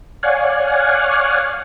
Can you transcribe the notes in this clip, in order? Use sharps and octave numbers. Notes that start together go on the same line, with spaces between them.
C#5 D5 F5 F#5 G#5